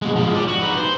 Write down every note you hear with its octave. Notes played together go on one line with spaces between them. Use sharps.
B2 G#3
F3 G#3
G4 D5
F#4
D#4 B4
C5